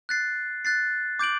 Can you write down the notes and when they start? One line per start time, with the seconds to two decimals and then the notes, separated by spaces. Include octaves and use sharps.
0.09 F#6 A6 C7
0.65 F#6 A6 C7
1.19 D6 G6 D7 F#7